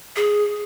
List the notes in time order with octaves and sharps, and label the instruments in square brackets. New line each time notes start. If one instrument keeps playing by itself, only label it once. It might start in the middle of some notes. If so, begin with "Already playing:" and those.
[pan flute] G#4